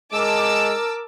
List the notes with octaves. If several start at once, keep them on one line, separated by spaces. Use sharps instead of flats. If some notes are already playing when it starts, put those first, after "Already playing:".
G#3 A#4 A5 D6 E6